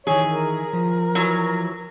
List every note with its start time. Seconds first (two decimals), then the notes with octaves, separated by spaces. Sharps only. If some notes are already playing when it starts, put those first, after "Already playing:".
0.07 D#3 E3 G#4 C#5
0.28 A#4
0.73 F3
1.15 E3 F#3